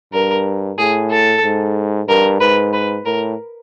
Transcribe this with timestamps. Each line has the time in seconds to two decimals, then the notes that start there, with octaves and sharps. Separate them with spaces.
0.13 G2 A#4
0.78 A2 G#4
1.11 A4
1.43 G#2
2.08 G2 A#4
2.40 G#2 B4
2.73 B4
3.05 A2 A#4